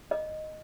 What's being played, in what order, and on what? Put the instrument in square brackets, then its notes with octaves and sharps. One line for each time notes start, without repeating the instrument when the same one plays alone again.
[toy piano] D#5